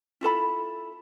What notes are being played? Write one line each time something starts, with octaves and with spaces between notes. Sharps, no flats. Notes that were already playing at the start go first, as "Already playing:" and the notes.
E4 F4 A4 B5